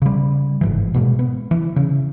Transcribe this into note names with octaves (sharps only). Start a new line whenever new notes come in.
C#3 G3
G1 G#2 E3
B2 G#3 A#3
B3
E3
C#3